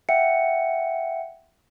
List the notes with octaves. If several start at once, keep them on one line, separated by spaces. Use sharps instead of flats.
E5 F#5 G5 C#7